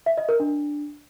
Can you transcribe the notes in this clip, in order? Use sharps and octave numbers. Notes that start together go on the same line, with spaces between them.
E5
D#5
A#4
D4